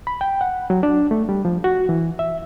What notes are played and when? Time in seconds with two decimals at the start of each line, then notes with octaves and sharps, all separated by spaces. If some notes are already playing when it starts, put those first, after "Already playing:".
0.07 B5
0.21 G5
0.41 F#5
0.70 F#3
0.83 D4
1.11 A3
1.29 G3
1.45 F3
1.64 F#4
1.89 E3
2.19 E5